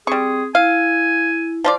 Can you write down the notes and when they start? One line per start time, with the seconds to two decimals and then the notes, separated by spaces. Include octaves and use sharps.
0.07 G3 C4 G#4 C#6
0.55 E4 F5 G#5
1.64 F3 F4 D5